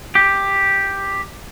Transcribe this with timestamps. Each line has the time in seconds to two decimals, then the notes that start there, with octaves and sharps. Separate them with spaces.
0.15 G4